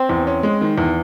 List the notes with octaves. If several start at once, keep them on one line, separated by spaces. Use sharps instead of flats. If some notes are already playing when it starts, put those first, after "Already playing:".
Already playing: C4
E2
C#4
G#3
D#3
E2